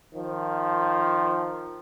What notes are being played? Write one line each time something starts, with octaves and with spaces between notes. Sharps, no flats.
D#3 F3